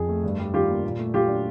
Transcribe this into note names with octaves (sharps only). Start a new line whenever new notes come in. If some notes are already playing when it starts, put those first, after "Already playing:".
Already playing: F2 G#4
A3
G2
G3
D#3 F4 G4
A#3
A#2
A3
F#3 F4 G4
D4